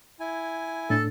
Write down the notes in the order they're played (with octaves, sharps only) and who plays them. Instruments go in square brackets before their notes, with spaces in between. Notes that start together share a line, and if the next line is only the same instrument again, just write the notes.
[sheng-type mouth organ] E4 G#5
[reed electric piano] A2 D4 [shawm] A4